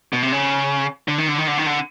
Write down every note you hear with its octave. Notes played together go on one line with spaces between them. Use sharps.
B2
C3
C#3
D3
D#3
D3
D#3
D3
D#3
D3